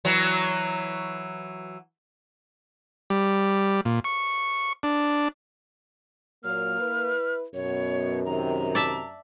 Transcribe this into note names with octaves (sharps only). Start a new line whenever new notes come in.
E3 F#3
G3
A#2
C#6
D4
A#2 F#3 A#3 F6
E4 B4
F#2 B2 C#5
C3 D#3 A#5
D5 E5 A5